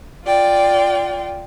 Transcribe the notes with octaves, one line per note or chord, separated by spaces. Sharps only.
F4 D5 G5